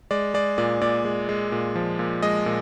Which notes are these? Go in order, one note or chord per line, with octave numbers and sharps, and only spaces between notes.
G#3 D5
G#3 D5
A#2 D5
A#2 D5
G#3
G#3
A#2
F3
A#2
G#3 D#5
A#2